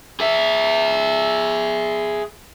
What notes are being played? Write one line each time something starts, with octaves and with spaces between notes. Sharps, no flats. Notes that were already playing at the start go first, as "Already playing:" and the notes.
G#4 E5